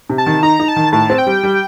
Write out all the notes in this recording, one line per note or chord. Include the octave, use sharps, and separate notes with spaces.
C3
A5
D#3
D#4 A#5
D#4
A5
D#3
A2 A5
C4
G5
G3
G3